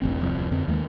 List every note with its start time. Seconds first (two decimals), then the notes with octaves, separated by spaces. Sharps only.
0.02 E1 A1 C4
0.21 D1 C2 F2
0.51 F2 D3 C4
0.68 D#2 G#3 A#3